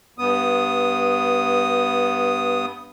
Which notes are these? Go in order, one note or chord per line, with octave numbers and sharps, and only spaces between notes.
G2 B3 D#6